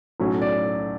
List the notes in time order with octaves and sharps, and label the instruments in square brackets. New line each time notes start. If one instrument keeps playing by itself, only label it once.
[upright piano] B1 A2 F#3 C#4 F#4
[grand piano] D5